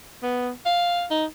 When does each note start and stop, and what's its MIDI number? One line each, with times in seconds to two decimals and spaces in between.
0.23 0.51 59
0.66 1.05 77
1.11 1.26 63